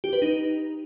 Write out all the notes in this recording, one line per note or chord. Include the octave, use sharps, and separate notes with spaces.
G4
B4
D#4